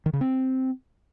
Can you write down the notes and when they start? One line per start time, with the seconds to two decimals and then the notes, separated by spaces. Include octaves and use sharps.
0.06 D#3
0.13 C#3
0.21 C4